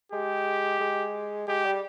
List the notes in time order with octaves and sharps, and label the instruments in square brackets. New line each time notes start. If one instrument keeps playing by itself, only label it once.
[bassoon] G#3 [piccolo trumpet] G4
[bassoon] G#3
[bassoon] G#3 [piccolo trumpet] G4
[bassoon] G3